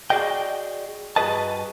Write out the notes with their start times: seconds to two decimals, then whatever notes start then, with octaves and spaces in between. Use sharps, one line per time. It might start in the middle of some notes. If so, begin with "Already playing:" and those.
0.10 F#4 G#4 D5 D#5 G5
1.16 G2 F#4 G#4 B4 D#5 A5